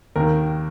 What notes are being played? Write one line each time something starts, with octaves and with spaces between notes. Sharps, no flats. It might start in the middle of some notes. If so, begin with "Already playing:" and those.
D#2 D#3 A#4